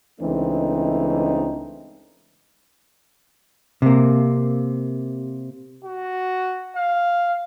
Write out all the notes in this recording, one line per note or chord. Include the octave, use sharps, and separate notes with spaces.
C#2 E3 A3 C4 D4 D#4
C3 A#3
F#4
F5